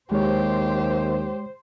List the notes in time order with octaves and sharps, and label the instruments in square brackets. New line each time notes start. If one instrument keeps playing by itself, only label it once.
[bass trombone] D#2 [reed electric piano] G#3 C#5 [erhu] G4 [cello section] C5